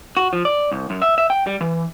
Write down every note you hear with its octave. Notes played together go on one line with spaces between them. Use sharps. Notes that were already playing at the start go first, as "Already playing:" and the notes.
F#4
F3
D5
C2
F#2
E5
E5
G5
G3
E3